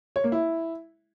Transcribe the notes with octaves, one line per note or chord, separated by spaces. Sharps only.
C#5
A#3
E4